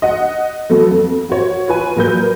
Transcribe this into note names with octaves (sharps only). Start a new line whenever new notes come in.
D#5 F#5
F#3 A3 B3 A4
F2
F#4 C#5
F4 B4 G#5
A#2 F#3 A#4 B4 G6